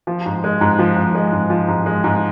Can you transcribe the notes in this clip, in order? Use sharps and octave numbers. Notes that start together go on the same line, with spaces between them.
F3
G#2
G#3
G#2
F3
G#2
G#3
G#2
F3
G#2
G#3
G#2